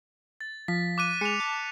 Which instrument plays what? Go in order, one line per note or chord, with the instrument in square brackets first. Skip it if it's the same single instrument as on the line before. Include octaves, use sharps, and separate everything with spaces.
[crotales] A6
[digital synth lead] F3 [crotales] B6
[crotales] D6 F#6 D#7
[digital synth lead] G#3 [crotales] C#7 F7
[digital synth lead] A5